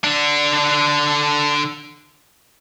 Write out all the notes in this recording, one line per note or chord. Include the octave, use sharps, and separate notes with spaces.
D3 D4